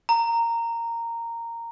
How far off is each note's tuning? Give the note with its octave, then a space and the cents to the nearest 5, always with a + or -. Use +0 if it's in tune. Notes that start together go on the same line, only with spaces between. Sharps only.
A#5 -10